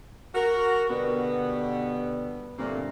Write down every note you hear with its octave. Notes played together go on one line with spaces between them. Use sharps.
F#4 A#4
B2 D3 G3 B3
G2 A#2 D3 A3 A#3 C4